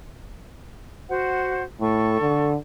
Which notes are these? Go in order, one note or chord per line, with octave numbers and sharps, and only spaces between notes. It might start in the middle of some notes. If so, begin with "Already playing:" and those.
F#4 C5 F#5
A2 A4 C#6
D3